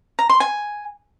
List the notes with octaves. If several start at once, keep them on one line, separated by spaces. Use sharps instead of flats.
A#5
C6
G#5